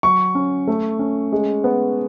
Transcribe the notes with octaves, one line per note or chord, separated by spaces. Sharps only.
F#3 C#6
C#4
A3
C#4
G#3
B3